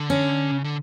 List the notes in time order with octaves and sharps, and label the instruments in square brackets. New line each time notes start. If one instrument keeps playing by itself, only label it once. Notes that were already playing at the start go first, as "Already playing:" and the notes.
Already playing: [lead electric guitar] D3
[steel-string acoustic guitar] C#4
[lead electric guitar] C#3
D3